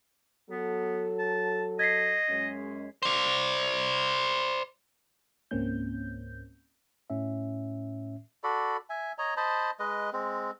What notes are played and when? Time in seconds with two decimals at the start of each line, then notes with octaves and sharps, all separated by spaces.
0.50 F#3 B3 A4
1.19 A5
1.79 D#5 G#6 B6 C7
2.29 F#2 G#3 C#4
3.03 C5 D5
5.51 C#2 G#2 A#3 C4 C#4 G6
7.10 A2 C#4 E5
8.44 F#4 A4 D5 B5
8.90 E5 G#5
9.18 C#5 D#5 A#5
9.37 C5 D#5 A5 B5
9.79 G#3 B4 D#5
10.13 G#3 C4